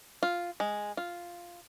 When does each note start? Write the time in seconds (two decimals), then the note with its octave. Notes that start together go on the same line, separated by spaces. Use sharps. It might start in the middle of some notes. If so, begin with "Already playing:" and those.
0.23 F4
0.60 G#3
0.97 F4